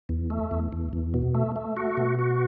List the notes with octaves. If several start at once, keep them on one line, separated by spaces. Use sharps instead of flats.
E2
A3
E2
E2
E2
B2
A3
A3
F#4
B2
F#4